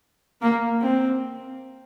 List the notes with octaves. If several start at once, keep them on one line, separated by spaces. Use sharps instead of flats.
A#3
C4